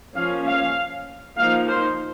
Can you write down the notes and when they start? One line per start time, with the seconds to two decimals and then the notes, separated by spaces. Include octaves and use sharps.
0.15 F3 A#3 C#4 F5
0.46 F5
1.38 F3 A#3 D#4 F5
1.69 C5